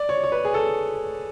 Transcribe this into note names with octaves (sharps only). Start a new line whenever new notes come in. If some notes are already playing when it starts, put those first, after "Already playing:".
Already playing: D5
C#5
C#5
B4
G#4
A4